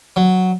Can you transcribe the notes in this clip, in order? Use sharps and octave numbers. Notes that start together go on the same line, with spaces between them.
F#3